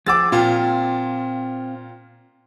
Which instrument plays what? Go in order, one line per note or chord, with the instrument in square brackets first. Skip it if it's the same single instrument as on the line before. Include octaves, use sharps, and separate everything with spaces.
[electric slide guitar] F3 G#4 F#5 [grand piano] D6 E6 A6
[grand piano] A#2 F4 [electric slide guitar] C4 F5 G5